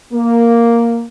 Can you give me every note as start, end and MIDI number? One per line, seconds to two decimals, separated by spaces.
0.13 1.03 58